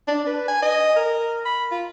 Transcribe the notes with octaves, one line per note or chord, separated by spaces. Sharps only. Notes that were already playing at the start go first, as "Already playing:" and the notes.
D4
B4
G#5
D#5
A#4
B5
F4